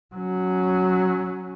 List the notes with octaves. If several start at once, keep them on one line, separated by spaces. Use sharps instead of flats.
F#3 C#4